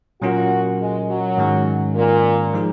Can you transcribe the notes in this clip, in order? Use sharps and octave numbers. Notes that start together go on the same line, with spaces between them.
A#2 F#3 C#4 F4 F#4 A#4
G#3
F#3
G#2 D#3 G#3 C#4
A#2
F3 G#3 D#4 G#4